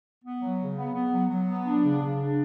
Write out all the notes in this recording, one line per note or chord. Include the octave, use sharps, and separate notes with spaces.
B3
F#3
C#3
B3
B3
F#3
F#3
B3
D4
C#3
C#3
D4